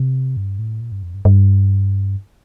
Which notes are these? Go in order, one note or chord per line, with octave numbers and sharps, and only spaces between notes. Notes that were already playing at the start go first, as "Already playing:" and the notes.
Already playing: C3
G2
A2
A#2
G2
F2
G2
G2